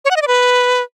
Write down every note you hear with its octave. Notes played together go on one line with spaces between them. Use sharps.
C#5
F#5
D#5
D5
B4